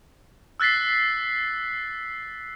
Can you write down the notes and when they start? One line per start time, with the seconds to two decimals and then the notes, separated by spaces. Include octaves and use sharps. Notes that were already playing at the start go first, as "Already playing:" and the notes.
0.60 E6 F#6 A6 B6 C7